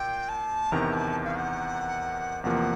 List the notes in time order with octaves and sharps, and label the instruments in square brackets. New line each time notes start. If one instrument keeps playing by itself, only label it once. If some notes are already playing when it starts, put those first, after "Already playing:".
Already playing: [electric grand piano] A#2 [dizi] G5
[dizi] A5
[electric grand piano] E2 C3 D#3 [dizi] A#5
[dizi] A5
F5
F#5
[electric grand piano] E2 C3 F3 A#3 [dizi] F#5